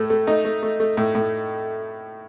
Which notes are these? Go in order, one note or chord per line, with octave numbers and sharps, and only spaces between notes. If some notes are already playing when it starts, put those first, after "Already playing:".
Already playing: A2 A3
A3
A3 D#4
A3
A3
A3
A2
A2